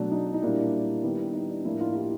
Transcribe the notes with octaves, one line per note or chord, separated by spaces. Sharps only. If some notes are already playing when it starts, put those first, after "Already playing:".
Already playing: B2 F#3 A3 D4
D#4
D#4
A#2 G3 A#3 D4 E4
D#3 G3 B3
D#4
D4
A2 F3 A#3 D4 E4
D#4 F4
F4 G4